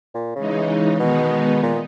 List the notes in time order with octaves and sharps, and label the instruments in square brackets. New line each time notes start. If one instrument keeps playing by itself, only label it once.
[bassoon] A#2
[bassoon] C#3 [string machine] E3 G#3 D#4
[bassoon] B2 [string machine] D#3 G#3 B3 D#4
[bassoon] A#2